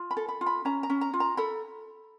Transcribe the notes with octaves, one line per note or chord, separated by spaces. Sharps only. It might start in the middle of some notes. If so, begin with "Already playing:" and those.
Already playing: F4
B5
A4
B5
F4
B5
C#4 A#5
A#5
C#4
A#5
F4
A#5
A4 B5